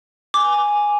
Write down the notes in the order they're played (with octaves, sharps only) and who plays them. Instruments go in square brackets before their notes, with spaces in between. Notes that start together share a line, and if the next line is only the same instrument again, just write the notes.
[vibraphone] G#5 [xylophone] D6